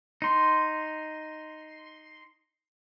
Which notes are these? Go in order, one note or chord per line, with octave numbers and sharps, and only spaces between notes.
D#4 C6